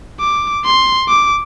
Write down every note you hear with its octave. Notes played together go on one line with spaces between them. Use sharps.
D6
C6
D6